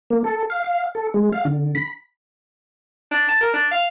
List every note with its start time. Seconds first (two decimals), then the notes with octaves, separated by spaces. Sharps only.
0.10 A#3
0.24 A4
0.50 F5
0.64 F5
0.95 A4
1.14 G#3
1.32 F5
1.45 D3
1.75 B5
3.11 D4
3.29 A5
3.41 A#4
3.54 D4
3.72 F5